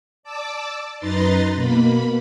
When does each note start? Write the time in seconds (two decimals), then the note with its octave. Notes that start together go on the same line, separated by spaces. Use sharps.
0.23 D5 A5 D6 E6
0.98 F#2 D#4 B4 A#5 C6 A6
1.55 B2 A#3 B5